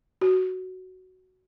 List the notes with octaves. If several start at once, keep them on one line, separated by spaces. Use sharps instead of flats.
F#4